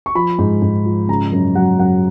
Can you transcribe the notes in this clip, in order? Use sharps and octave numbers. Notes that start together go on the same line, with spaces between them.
C#6
F3 B5
G#2
G#2
F3
C#3 A#5
F#2
F#3 F#5
F#2 F#5